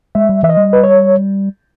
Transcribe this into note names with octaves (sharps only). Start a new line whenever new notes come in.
G#3 E5
G3
E3 E5
D#5
G3
B4
C#5